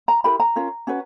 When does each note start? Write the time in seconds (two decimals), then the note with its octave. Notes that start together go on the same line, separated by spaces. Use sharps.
0.08 A#5
0.24 E4 G4 A#4 B5
0.40 A#5
0.56 C#4 F4 A#4
0.87 C#4 F#4 B4